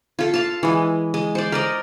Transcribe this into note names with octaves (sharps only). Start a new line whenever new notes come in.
F4 A4
F5 A5
E3 G#3
G#3
C5 D5
A#4 D5 D#5